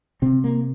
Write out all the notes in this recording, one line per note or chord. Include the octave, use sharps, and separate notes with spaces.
C3 C4
A#3